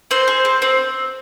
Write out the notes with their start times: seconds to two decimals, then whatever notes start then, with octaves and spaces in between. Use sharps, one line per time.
0.11 C4 C5
0.28 G#4
0.45 C4
0.62 C4